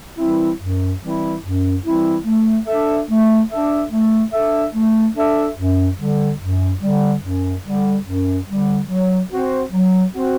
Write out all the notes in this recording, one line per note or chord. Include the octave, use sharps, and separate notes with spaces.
E3 G3 C4 E4
F#2
E3 G3 C4 E4
F#2
E3 G3 C4 E4
A3
D4 A4 E5
A3
D4 A4 E5
A3
D4 A4 E5
A3
D4 A4 E5
F#2
D3 G3
F#2
D3 G3
F#2
D3 G3
F#2
D3 G3
F#3
C4 F#4 C5
F#3
C4 F#4 C5